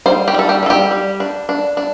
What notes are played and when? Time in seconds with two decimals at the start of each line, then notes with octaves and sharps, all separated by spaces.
0.06 G3 C5
0.28 G4
0.34 G3 A4
0.49 G4
0.63 G3 A4
0.70 G4
0.91 G3
1.20 D4
1.49 D4
1.77 D4